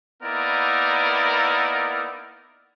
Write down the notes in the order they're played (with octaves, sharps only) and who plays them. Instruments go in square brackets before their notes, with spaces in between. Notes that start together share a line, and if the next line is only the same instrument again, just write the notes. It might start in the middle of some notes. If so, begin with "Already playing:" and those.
[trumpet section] A#3 B3 D#4 E4 A#4 D5